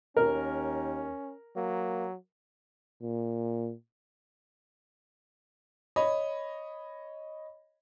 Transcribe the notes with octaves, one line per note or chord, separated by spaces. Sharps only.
D#2 C#4 A#4
F#3 A#3
A#2
C#5 D#5 B5